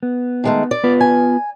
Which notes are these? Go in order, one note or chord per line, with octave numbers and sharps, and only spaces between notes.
B3
D#3 G#3 A3
D5
B3 F4 B4
G#5